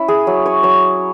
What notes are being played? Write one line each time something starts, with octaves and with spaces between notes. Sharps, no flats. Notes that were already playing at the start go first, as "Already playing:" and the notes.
Already playing: C#4 E4
G#4
F#3
C#5
F#3 C#5